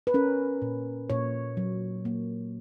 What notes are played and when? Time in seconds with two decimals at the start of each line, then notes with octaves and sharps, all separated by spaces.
0.07 B4
0.14 C#4 A#4
0.62 A#2
1.10 A#2 C#5
1.57 F#3
2.05 A#3